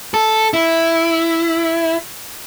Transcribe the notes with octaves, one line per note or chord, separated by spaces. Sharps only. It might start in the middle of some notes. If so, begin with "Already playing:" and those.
A4
E4